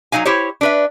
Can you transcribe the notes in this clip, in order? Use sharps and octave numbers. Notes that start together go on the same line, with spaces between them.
F#3 C4 D#4 F5 G#5
E4 G4 C5 C#5
D4 B4 E5